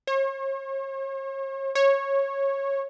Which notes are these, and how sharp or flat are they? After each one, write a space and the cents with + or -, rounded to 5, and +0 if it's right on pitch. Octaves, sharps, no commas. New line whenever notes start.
C#5 -40
C#5 -15